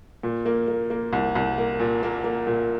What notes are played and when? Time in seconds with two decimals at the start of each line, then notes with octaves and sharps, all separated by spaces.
0.23 A#2
0.46 A#3
0.68 A#3
0.90 A#3
1.13 C2
1.35 C2
1.58 A#3
1.80 A#2
2.03 A#3
2.24 A#3
2.47 A#2